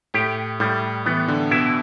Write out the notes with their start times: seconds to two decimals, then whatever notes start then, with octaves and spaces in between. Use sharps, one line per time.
0.14 A2 G4
0.60 A2 G3
1.06 E3 B3
1.28 D3
1.51 B2 E4